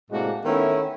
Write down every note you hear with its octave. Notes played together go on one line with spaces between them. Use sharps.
A2 C3 G#3 A#3 D4 F#4
D#3 A3 B3 C#4 E4